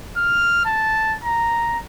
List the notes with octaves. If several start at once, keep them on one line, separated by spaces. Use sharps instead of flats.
F6
A5
A#5